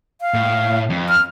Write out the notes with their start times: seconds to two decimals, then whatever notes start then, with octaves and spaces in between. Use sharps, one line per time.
0.21 F5
0.34 A2
0.90 F2
1.09 F6